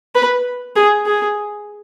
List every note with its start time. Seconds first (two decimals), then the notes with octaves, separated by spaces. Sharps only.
0.15 B4
0.76 G#4
1.06 G#4